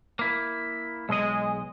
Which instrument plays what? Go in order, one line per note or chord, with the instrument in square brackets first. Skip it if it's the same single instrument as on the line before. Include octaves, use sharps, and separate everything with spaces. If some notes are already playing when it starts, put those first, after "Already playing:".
[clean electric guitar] A#3 E4
[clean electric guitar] B1 D#5 [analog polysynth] G#3